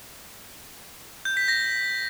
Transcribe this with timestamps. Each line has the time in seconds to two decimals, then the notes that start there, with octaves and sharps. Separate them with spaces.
1.25 G6
1.37 B6
1.48 A#6